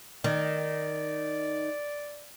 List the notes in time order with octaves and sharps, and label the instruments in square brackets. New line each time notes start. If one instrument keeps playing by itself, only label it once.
[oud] D#3 [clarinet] D5